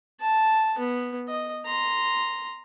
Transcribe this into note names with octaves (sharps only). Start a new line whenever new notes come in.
A5
B3
D#5
A#5 C6